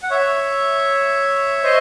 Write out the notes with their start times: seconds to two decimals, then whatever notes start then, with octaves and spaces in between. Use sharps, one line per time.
0.03 F#5
0.10 C#5 E5
1.63 C5 D#5